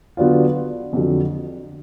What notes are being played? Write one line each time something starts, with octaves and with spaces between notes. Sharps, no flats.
D3 F#3 B3 D4 F4
F2 D3 F#3